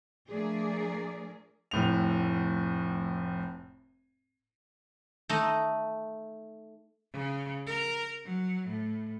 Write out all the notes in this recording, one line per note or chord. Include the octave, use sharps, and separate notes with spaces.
F3 A3 D4 G#4 A#4 D5
F1 A2 F7
A3 D#4
C#3
A#4
F#3
A2